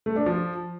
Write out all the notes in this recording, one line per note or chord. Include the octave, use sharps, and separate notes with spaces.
A3
D4
F3